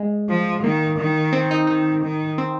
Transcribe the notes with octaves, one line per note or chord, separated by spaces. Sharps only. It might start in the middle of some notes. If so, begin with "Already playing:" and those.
Already playing: G#3
F3
D#3 A#3
D#3
C4
D#4
D#3 D#4
D#3
C4